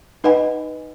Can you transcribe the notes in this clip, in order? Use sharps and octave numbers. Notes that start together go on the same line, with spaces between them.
D#4 B4 D#5 F#5 G#5 B5